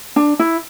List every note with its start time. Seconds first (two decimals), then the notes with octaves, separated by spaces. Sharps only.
0.16 D4
0.39 E4